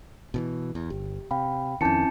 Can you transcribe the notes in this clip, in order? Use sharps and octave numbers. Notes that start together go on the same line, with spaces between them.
B2 D#3 E3
E2
G1 G4
C3 F5 G5 B5
F2 D#3 C4 C#4 E4 A5 G6 C#7